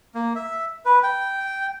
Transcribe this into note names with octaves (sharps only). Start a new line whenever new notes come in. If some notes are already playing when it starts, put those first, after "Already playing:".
A#3
E5
B4
G5